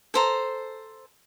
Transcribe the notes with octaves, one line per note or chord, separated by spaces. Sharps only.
A4 C5 A#5